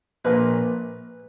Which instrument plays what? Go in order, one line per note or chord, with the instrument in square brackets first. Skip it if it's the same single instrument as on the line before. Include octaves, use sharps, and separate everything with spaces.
[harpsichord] A#1 A#2 B4